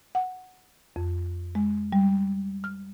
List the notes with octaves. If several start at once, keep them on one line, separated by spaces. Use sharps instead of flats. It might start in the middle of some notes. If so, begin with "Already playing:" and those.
F#5
F2
G#3
G3
F6